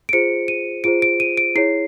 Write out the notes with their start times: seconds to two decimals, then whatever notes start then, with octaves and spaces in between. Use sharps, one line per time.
0.09 D7
0.13 F4 G#4 C5 C#7
0.48 D#7
0.84 F4 G#4 C5 D7
1.02 D7
1.20 D#7
1.37 D7
1.55 E4 G#4 C#5 C7